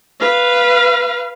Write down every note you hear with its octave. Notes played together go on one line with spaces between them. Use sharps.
B4 F5